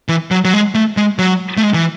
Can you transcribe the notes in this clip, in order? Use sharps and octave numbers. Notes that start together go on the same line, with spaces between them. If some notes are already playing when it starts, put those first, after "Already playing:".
E3
F#3
F#3
G#3
A3
G#3
F#3
A3
G#3
E3